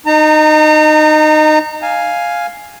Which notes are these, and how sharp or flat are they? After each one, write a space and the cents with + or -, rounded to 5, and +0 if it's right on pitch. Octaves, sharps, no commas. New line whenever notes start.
D#4 -15 A#5 -40
F5 +0 G#5 +0